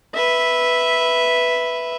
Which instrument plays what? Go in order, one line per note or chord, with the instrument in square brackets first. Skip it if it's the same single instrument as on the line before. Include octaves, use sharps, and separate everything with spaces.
[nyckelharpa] B4 E5